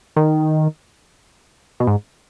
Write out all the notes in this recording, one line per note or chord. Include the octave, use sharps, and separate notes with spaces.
D#3
B2
G#2